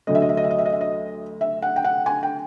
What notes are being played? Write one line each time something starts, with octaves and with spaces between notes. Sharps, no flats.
D2 D3 F#3 A3 D#5
E5
D#5
E5
D#5
E5
D#5
E5
D#5
E5
D#5
E5
F#5
G5
F#5
G#5
G5